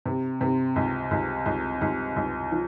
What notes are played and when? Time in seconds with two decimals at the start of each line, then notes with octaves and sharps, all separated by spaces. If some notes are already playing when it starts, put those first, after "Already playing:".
0.06 C3
0.41 C3
0.76 C#2
1.11 C#2
1.46 C#2
1.81 C#2
2.16 C#2
2.51 F3